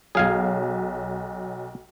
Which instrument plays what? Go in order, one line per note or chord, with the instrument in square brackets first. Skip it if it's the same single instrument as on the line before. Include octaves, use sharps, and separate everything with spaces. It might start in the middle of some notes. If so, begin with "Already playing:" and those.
[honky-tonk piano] B1 F#3 [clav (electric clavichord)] G#4 F5 G#5